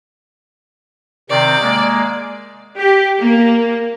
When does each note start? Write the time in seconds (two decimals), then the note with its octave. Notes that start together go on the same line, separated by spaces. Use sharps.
1.30 C3 D#3 C4 D5
1.60 G#3 A#3
2.79 G4
3.21 A#3